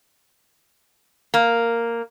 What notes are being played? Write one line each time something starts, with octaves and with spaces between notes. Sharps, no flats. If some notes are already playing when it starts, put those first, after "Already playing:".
A#3